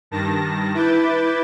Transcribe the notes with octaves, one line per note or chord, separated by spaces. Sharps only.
G2 D#3 A5 A#6
E4 B4 D6 G6 A6